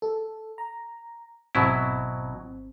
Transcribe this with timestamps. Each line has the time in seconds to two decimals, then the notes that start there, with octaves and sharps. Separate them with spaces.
0.02 A4
0.58 A#5
1.55 G#1 B2 F#3 C4 E4